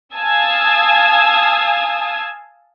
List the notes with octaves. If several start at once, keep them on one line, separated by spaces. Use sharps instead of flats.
F5 G#5 A5 D#6 E6 G#6